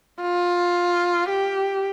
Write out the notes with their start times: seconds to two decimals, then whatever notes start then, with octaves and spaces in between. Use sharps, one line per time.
0.21 F4
1.29 G4